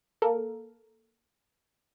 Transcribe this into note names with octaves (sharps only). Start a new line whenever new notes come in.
A#3 A4 A#4